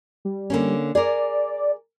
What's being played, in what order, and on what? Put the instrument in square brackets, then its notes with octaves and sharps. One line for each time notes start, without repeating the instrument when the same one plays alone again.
[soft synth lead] G3
[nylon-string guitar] D3 A#3 C#4
[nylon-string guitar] G#4 A#4 [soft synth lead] D5